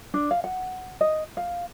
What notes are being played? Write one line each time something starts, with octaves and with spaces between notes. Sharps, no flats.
D4
F5
F#5
D#5
F5